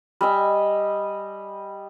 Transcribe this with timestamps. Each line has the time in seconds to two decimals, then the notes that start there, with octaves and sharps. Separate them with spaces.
0.21 G3 D#5 G#5 E6